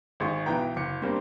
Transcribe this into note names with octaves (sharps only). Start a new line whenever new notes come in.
G#1 G#3 C#6
B1 E3 B3 G5 A#5
F#1 D6 C#7
G3 A#3 C4 D4